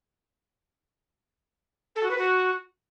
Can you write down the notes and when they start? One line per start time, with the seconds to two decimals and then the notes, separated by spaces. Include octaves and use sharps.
1.95 A4
2.03 F#4
2.10 B4
2.18 F#4